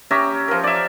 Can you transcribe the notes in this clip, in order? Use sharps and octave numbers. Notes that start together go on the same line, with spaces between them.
C#4 G4 E5 A#5
F3 A#4
D5 E5